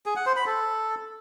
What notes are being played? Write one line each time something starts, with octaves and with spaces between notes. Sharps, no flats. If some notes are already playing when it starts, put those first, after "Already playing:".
G#4
F#5
C5
B5
A4